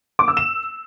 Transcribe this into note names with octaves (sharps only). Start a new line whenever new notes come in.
D6
E6
E7